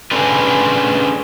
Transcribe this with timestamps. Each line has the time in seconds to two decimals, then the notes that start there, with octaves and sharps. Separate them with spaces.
0.11 A3 C#4 D4 G#4 A4 B4